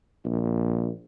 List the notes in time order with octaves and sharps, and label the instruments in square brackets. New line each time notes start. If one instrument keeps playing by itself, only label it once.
[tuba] A#1